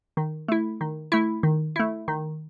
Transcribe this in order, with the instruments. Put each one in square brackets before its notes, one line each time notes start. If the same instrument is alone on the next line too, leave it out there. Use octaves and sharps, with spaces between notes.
[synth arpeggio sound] D#3
A3 E4
D#3
A3 E4
D#3
A3 E4
D#3